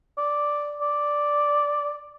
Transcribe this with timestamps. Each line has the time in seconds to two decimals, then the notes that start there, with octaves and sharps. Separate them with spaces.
0.18 D5
0.81 D5